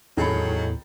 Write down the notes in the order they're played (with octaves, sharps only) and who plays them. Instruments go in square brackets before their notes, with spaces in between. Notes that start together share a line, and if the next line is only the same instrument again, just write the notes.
[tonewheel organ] E2 A2 [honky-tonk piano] D#3 [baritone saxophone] F#3 [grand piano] G#4 A4 B5